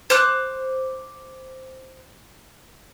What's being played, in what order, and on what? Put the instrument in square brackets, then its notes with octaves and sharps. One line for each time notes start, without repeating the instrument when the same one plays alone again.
[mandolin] C5 D6 F#6